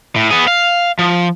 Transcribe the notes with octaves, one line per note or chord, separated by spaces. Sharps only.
A2
B3 G#4
F5
F3